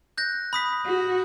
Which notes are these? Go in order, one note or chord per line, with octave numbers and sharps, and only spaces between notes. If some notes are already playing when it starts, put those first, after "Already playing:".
F#6 G6 A#6
B5 D#6 B6
F#4